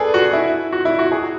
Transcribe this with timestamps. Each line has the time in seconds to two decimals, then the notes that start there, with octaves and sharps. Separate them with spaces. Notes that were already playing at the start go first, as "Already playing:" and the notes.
Already playing: G#4 A4 B4 D5
0.14 F#4
0.33 E4
0.73 F#4
0.85 E4
0.99 F#4
1.12 G#4